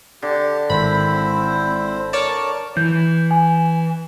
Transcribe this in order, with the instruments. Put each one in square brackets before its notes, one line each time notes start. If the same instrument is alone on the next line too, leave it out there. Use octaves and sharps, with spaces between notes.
[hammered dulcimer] D3 [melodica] G4
[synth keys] G#1 B5 [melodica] C4 E4 C5
[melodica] A#4 [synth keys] C#5 D5 A5
[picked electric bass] E3 [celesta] G6
[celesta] G#5